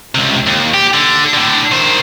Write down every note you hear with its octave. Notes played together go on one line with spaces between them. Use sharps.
C#2 C3
D#2
G4
D3
A2 D3
D#3 C5